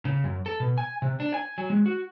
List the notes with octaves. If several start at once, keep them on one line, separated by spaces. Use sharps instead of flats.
C#3
F#2
A4
B2
G#5
C3
D4
G#5
F#3
G#3
F#4